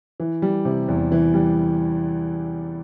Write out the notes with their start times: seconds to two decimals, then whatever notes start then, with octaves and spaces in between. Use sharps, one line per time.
0.20 E3
0.42 G3
0.65 C3
0.88 E2
1.12 E3
1.34 G3